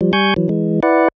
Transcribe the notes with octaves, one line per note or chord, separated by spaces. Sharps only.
F3 G3
G3 G#5 C#6 G6
E3 F#3
E3 G#3
E4 B4 D5 F#5